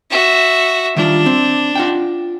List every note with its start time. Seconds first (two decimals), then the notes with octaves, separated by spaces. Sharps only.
0.10 F#4 E5
0.96 D#3 G3 D4 F4
1.26 C4
1.75 F4 F#5 G5